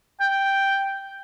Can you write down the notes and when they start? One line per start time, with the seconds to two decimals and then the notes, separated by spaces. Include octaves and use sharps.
0.20 G5